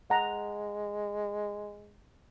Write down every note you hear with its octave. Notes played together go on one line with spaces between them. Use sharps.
G#3 F#5 A#5